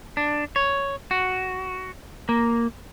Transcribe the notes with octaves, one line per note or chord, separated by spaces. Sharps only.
D4
C#5
F#4
A#3